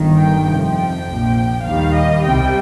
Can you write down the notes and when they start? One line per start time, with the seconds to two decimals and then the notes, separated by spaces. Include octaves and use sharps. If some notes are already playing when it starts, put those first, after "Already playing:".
Already playing: G1 G2 D#3
0.18 G5
0.47 F2 C3 F3
0.76 G5
1.06 A#1 A#2 F3 G5
1.65 D#2 D#3 G3 F5
1.94 D#5
2.24 C2 C3 G3 G5